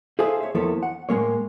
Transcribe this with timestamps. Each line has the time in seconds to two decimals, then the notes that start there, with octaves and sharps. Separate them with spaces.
0.19 G#4 A4 C5 E5 F5 G#5
0.41 C#5 E5
0.55 E2 F3 A#3 E4 A4 C#5
0.83 F#5
1.09 A2 G#3 A#3 C#5